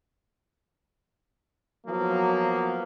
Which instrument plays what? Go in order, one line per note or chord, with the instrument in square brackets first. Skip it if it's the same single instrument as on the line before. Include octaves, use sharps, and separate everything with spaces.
[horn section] F3 A#3 B3 [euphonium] F#3